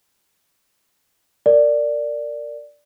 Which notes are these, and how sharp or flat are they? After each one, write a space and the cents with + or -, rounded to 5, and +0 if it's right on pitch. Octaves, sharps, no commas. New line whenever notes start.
A#4 -20 D5 +0